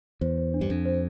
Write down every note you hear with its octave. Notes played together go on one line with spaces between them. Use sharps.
E2 C5
C5
D4
G2
F2 D4
C5